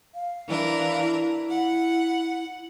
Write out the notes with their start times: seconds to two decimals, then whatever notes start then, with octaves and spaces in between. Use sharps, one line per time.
0.15 F5
0.47 E3 D4 A#4
1.01 E4
1.50 F#5